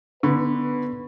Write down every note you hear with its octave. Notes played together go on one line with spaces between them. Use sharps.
D3 B3 B4 B5 C#6